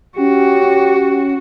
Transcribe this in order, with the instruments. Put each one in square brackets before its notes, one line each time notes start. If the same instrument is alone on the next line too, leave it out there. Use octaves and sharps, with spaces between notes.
[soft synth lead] C#4 [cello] F#4 [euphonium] G4